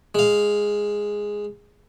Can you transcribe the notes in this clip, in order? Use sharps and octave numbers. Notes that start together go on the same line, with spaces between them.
G#3 F5